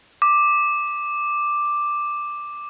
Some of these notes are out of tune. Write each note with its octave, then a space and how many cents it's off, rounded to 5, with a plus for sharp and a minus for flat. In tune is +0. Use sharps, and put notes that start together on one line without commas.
D6 +5